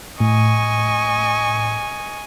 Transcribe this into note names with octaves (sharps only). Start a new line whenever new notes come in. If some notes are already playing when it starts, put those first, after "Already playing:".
A2 D#5 G#5 C#6